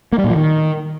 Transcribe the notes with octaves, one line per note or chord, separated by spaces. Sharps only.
A#3
G3
A#2
F3
D#3